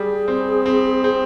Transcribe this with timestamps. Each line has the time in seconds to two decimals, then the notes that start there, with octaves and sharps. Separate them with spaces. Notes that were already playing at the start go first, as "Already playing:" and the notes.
Already playing: G3 G#4
0.28 C4
0.66 C4
1.04 C4